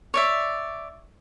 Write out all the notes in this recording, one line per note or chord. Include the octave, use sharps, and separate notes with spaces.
C#5 D5 E5